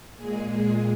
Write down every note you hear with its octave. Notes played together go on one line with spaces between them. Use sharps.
A#2 G#3 G#4
G#4